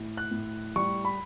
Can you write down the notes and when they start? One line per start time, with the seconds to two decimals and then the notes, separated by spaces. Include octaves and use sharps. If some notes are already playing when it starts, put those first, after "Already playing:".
Already playing: A2
0.17 F#6
0.31 A2
0.76 G3 C#6
1.05 B5